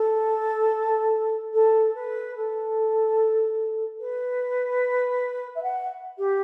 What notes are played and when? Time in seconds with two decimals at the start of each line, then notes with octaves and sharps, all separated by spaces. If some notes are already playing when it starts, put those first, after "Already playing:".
Already playing: A4
1.53 A4
1.94 B4
2.36 A4
3.99 B4
5.55 E5
5.63 F#5
6.18 G4